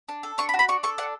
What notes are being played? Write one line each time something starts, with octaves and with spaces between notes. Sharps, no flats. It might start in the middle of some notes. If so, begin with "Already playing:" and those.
D4
A4
D4 C#6
B5
F#4
B5
D4 C#6
A4 C#6
D4 F#5